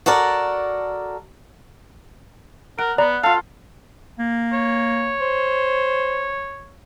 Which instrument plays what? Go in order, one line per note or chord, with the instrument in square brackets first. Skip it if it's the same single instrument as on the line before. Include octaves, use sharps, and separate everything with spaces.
[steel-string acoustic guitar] F#4 A4 A#4 D5
[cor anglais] A#4 [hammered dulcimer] F#5 [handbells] D7
[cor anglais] B3 [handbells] D5 A#5
[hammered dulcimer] F4 A4 [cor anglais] F5
[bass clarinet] A#3
[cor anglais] C#5
[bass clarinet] C5